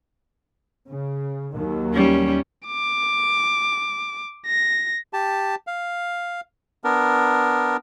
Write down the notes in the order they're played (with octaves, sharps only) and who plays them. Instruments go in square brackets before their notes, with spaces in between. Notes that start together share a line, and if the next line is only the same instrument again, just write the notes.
[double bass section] C#3
D#2 D#3 F#3
[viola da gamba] G3 C#4
[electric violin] D6
A#6
[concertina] G4 A5
F5
B3 D4 A#4